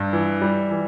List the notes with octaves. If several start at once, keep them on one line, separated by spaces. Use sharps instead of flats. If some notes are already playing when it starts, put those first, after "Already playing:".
Already playing: G2
E3
G3
E3